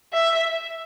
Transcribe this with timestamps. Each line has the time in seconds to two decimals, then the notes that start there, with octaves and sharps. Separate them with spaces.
0.13 E5